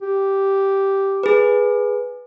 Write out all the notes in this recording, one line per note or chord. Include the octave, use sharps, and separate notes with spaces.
G4
G#4 B4